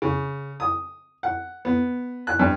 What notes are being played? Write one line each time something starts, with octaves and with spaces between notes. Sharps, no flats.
C#3
D#6
F#5
B3
F#6
G2